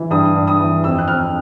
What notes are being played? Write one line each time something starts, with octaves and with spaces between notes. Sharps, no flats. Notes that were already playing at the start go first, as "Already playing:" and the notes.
Already playing: E3
G2 D#6
G2
D#6
E3
F2 E6
F#6
F2 F6